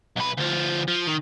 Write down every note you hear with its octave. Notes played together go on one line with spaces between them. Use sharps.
B1 B4
D2 F3
F3
D#3